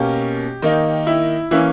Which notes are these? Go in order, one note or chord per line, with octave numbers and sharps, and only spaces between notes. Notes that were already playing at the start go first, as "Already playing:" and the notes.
Already playing: B2 A#3 C#4 G4
D#3 A#3 D#4
E4
E3 A#3 C#4 E4